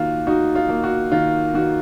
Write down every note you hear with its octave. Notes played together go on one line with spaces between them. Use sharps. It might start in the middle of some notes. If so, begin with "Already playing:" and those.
Already playing: D#3 A#3 F4 F#4
D#4 F#4
F4
A#3
F#4
D#3 F4
D#3 F#4